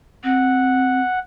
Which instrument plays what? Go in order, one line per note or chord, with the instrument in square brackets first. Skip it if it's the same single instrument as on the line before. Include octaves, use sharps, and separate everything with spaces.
[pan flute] C4 [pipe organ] F#5